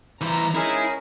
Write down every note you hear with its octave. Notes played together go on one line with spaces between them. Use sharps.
E3 C5 A#5 B5
G#3 C#4 D#4 E4 G#4 A#4